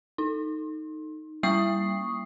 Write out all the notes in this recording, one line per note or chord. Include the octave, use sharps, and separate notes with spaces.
D#4
G3 A#3 C#6 D#6 C7